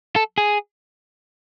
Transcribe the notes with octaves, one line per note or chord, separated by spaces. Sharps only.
A4
G#4